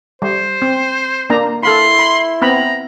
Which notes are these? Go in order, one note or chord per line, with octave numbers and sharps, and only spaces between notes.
G3 C5
C4
A#3 D4 A#5
E4 A4 F5 B5 C6
B5
B3 C4 A#5 B5